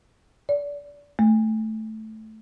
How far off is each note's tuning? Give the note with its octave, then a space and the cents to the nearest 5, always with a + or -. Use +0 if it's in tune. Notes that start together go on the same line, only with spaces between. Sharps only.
D5 -30
A3 -5